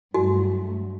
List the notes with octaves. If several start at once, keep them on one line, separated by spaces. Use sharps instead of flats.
G2 F#3 A3 F#4